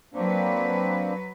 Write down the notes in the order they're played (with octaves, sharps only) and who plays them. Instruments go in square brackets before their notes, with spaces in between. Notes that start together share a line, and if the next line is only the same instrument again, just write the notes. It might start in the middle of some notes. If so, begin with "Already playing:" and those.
[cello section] F#3 B4 [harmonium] A#3 C4 D4